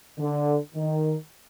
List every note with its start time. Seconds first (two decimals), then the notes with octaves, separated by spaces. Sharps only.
0.18 D3
0.75 D#3